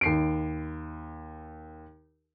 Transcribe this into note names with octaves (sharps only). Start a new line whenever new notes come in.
D#2 C7 D7